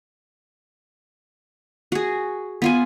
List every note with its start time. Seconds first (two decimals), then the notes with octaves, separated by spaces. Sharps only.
1.92 F#4 G#4
2.62 B3 F4 G#5